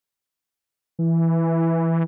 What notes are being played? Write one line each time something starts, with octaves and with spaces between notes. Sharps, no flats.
E3